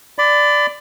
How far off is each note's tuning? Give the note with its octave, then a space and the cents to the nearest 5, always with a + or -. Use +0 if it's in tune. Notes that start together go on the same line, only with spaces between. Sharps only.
D5 +0 B5 +30